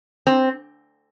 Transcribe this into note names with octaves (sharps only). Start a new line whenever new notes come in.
C4